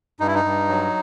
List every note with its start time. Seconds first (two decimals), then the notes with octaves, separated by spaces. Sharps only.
0.20 G2 D#4
0.28 E4
0.35 D#4
0.45 G2
0.69 F#3